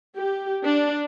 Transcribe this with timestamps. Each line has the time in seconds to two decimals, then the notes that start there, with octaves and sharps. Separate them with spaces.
0.15 G4
0.64 D4